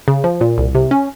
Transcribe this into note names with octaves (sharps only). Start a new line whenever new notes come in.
C#3
F3
A#2
C2
C3
C#4